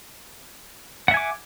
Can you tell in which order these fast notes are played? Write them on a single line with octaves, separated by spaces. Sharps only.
F#5 E5 G#5 D6